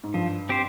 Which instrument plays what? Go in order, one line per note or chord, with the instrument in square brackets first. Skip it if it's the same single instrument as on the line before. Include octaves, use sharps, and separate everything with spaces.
[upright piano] G#2
[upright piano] G2 [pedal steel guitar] F3
[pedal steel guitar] C4 G4 C5